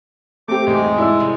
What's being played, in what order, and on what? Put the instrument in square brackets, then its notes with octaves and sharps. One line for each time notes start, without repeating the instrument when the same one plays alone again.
[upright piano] A3 C4 G4 [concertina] D6
[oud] E2 G#2 C3 [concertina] G#3
[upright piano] E4 D5 E6
[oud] C3